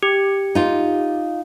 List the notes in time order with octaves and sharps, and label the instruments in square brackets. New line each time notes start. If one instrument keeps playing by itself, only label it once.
[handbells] G4
[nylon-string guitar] D#4 F4